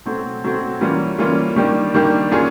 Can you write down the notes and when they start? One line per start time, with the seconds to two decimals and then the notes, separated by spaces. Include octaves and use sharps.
0.05 B2 F#3 A3 C4
0.44 B2 F#3 A3 C4
0.81 E3 G3 A#3 C#4 F4
1.18 E3 G3 A#3 C#4 F4
1.56 D#3 G3 A#3 D4 G4
1.94 D#3 G3 A#3 D4 G4
2.31 F#3 A#3 C#4 F4 G#4